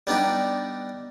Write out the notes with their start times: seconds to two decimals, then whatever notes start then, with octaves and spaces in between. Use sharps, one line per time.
0.07 G3 B3 D4 D#4 G4